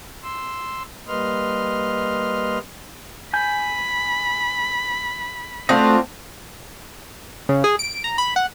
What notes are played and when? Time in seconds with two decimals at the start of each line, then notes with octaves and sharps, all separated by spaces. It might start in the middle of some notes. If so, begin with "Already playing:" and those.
0.23 C6 E6
1.07 G3 A#3 B4 D#5 C6 F6
3.34 G#5 B5 G6
5.69 A3 C4 D4 F4 F#4 D#5
7.49 C#3
7.64 G#4
7.79 D7
8.04 A#5
8.18 B5
8.36 F#5